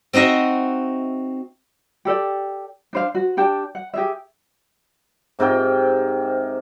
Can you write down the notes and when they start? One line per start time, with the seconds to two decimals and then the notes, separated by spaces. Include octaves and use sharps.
0.13 C4 D#4 F#4 D#5 E5
2.05 G4 A4 D5 G5
2.93 D4 C5 F5
3.15 F#4
3.37 D4 G4 G5 A5
3.75 F#5
3.94 G4 G#4 E5
5.39 G#2 C3 A#4 G5